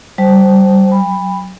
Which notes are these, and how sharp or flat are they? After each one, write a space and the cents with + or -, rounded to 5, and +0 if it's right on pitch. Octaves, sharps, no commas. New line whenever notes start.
G3 -25 C5 +0 A5 -35
F#3 +10 G5 +40 B5 +0